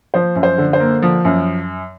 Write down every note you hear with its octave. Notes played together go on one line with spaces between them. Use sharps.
F3 C5
F#2
C5
D3
C5
A#3
F3
F#2